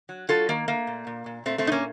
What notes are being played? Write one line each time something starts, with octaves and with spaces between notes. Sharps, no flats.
F#3
F#3 F4 A4
D#3 A#3
A3 A#3
A#2
A#2
A#2
A#2 A3 C4
A3 C4
A#2 D#4
A#3 C#4